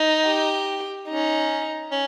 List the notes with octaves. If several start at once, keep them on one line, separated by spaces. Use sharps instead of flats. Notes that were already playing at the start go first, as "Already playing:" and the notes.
Already playing: D#4
G4
C#4 D#4
C#4